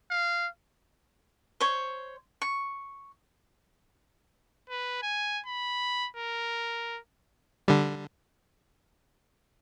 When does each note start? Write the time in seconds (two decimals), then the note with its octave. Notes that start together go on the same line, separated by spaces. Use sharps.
0.10 F5
1.60 C5 C#5
2.42 C#6
4.70 B4
5.03 G#5
5.46 B5
6.16 A#4
7.68 D3 G3